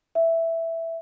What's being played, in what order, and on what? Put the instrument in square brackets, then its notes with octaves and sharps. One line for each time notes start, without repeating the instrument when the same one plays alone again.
[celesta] E5